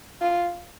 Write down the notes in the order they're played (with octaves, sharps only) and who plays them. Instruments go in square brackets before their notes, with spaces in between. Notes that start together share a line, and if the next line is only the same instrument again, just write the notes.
[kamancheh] F4